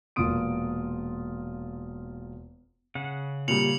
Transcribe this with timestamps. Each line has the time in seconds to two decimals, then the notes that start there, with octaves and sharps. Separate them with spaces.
0.16 E1 A#2 F4 D#6 D7
2.95 C#3 F#5
3.48 A#2 G3 C#7 F7 F#7